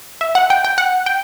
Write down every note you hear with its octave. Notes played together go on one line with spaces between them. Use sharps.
E5
F#5
G5
G5
F#5
G5